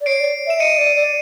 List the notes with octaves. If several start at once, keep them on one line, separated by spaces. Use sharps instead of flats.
D5
C#5 C7 D7
D5
E5 E7
D#5 C#7 D#7
D5
D5